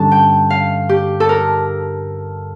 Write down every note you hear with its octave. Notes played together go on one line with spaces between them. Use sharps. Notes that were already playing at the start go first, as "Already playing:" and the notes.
Already playing: G2 D3 G3 C#4 A5
G5
F5
G4
A4
A#4